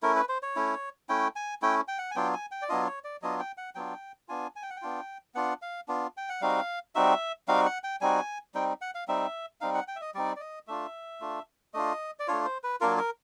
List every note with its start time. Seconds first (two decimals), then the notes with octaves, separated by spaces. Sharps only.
0.03 A3 C#4 E4 A#4
0.16 B4
0.29 C5
0.43 C#5
0.56 A3 C#4 E4
1.09 A3 C#4 E4 G5
1.36 G#5
1.62 A3 C#4 E4 G5
1.88 G5
1.98 F#5
2.11 G#5
2.16 F#3 B3 D4 F4 G5
2.34 G#5
2.51 G5
2.62 D5
2.69 F#3 B3 D4 F4 D#5
2.87 C#5
3.04 D5
3.22 F#3 B3 D4 F4 D#5
3.39 G5
3.57 F#5
3.75 F#3 B3 D4 F4 G5
4.28 B3 D4 F4 G#5
4.56 G#5
4.63 G5
4.70 F#5
4.77 G5
4.82 B3 D4 F4
5.35 B3 D4 F4 F#5
5.62 F5
5.88 B3 D4 F4
6.17 G5
6.29 F#5
6.42 G3 C4 D#4 F#4 F5
6.95 G3 C4 D#4 F#4 E5
7.48 G3 C4 D#4 F#4 F5
7.66 F#5
7.84 G5
8.01 G3 C4 D#4 F#4 G#5
8.54 G3 C4 D#4 G5
8.81 F#5
8.95 F5
9.08 G3 C4 D#4 E5
9.61 G3 C4 D#4 F5
9.74 F#5
9.88 G5
9.96 E5
10.01 D#5
10.14 G3 C4 D#4 D5
10.36 D5
10.40 D#5
10.67 A3 D4 F4 E5
11.21 A3 D4 F4
11.74 A3 D4 F4 D#5
12.19 D5
12.28 A3 D4 F4 C#5
12.46 C5
12.64 B4
12.81 F#3 A#3 D4 F4 A#4
12.98 A#4